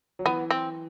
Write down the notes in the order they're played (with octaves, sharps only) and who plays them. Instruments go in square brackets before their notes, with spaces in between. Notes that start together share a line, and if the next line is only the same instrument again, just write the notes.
[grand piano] F#3
[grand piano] E3 [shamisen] B3
[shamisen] C4